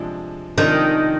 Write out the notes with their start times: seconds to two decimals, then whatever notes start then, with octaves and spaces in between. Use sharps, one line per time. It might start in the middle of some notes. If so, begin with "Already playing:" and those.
Already playing: C3 F3 G#3 D4
0.58 C3 D#3 F3 G#3 D4